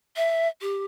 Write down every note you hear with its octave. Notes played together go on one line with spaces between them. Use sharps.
E5
G4